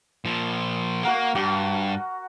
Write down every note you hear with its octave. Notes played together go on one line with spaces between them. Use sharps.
A#2 F3
A#3 F#4 A#4 F#5
G2 F#4